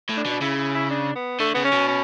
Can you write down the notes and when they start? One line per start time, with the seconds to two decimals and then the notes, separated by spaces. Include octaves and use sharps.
0.09 A2
0.17 D4
0.26 B2
0.31 D4
0.42 C#3 E4
0.58 E4
0.75 E4
0.91 D4
1.16 B3
1.40 D3 A3
1.54 C#3 B3
1.64 C#4
1.72 B2
1.88 C#4